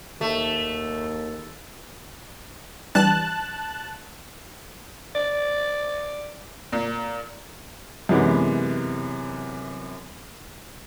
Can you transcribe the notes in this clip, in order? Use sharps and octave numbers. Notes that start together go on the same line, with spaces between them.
D#2 A3
E3 G3 D4 A5 F#6
D5
A#2
F#2 C3 E3 G#3 B3